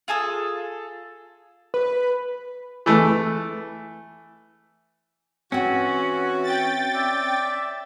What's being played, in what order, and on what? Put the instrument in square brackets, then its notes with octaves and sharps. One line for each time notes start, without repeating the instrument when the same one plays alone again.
[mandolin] F4 G#4 A4 D#6
[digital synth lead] B4
[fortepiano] E3 A3
[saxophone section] E3 F#4 [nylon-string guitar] C4 F#5 [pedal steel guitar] C#4
[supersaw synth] G5 A6
[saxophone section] D5 E5